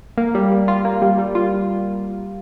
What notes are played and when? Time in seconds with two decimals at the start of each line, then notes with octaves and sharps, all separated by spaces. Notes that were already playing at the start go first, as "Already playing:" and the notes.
0.18 A#3
0.35 G3
0.52 G3
0.68 F4
0.85 A#3
1.02 G3
1.18 G3
1.35 F4